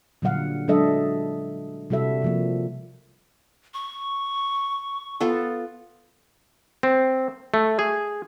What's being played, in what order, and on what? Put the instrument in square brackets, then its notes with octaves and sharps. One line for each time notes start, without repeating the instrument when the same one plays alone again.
[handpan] A#2 D3 F#3 G3 F5 F#5
F#3 G#3 D4 A4 D#5 E5
C3 G3 F#4 A4 E5
C3 F3 A#3
[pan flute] C#6
[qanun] B3 F4 A4
[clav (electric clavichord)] C4
A3
G#4